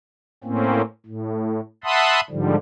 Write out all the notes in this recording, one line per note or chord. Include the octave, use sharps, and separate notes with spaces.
A2 A#3 C4 C#4
A2
E5 F#5 A5 B5 C6 D#6
G#2 D3 F3 G3